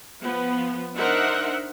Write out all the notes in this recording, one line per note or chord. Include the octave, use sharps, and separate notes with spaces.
F3 B3
D4 D#4 A#4 C5 E5 F#5